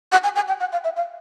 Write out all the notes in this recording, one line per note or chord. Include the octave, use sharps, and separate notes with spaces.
F#5
G#5
G#5
G5
F#5
F5
E5
F5